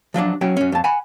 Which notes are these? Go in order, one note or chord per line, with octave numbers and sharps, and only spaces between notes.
F3 F#3 C#4 D4
F#3 C#4 G5
F#2 C#4
F2 A5
F#5 G#5 B5